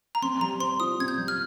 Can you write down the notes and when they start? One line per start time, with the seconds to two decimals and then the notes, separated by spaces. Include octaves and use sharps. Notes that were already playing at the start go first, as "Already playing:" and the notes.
0.15 A#5
0.22 C4 C6
0.41 G3 A#5
0.60 C5 C6
0.80 F4 D#6
0.99 C4 G#6
1.08 G6
1.18 G3
1.28 F6